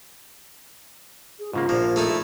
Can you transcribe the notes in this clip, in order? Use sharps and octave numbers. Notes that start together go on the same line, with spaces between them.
G#4
G#2 C#3 A#3 F4
A#1 F3 A#3
A3 D#4 E4